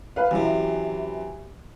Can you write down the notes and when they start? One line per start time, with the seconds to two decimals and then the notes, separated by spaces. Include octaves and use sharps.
0.16 B4 F5
0.31 F#2 C3 E3